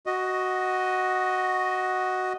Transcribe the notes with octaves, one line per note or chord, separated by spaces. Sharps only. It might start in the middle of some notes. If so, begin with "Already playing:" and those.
F#4 D#5